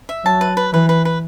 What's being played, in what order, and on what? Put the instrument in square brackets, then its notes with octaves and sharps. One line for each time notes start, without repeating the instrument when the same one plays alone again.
[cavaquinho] E5
[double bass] F#3 [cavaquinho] A5
[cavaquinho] B4
B4
[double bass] E3 [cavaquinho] B4
[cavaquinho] B4
B4